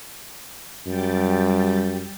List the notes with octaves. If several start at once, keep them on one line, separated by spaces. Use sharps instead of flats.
F#2 G3 G5 A6